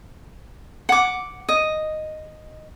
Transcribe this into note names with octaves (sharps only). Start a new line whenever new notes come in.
F#5 D6
D#5